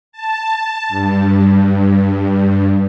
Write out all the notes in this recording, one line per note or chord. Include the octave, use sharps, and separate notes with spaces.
A5
G2